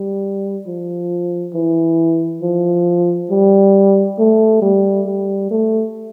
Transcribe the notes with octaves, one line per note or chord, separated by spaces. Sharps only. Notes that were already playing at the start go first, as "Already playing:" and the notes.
Already playing: G3
F3
E3
F3
G3
A3
G3
G3
A3